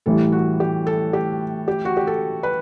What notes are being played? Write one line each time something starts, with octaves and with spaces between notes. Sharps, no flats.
A2 E3 G3 A4
F#4
G4
A4
G4
G4
F#4
G4
A4
B4